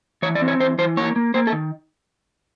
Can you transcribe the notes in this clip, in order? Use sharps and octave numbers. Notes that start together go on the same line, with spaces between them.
E3 C#5
D5
C4
C#5
E3 C5
E3 C5
A#3 C#5
A#3
A#3 C5
A4
D#3